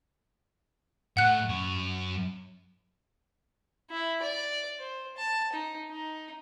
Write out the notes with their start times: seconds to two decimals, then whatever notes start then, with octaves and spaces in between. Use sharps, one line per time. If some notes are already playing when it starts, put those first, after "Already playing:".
1.17 A2 F#5 F#6
1.49 F#2 C#5
3.90 E4
4.23 D5
4.78 C5
5.17 A5
5.52 D#4
5.90 D#4